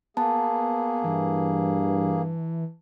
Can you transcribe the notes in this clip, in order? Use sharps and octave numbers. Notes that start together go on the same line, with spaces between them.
A#3 B3 G#4 A5
G2 E3